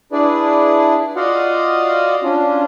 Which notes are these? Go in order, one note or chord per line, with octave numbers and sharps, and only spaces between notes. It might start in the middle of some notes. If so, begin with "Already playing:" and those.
D4 E4 G#4 B4 D5
F4 F#4 D5 D#5 F5 F#5
C#4 D4 F4